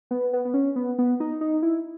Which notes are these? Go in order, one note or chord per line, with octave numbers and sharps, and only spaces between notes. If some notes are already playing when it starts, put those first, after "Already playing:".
B3
B3
B3
C#4
B3
B3
D#4
D#4
E4